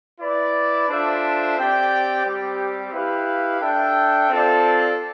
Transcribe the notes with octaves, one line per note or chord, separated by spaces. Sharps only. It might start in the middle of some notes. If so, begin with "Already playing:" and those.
E4 B4 D5
D4 F4 A4 C5 E5
C4 G4 D5 G5
G3 C4 G4
E4 G4 B4 F5
D4 A4 E5 G5
C4 F4 A4 D5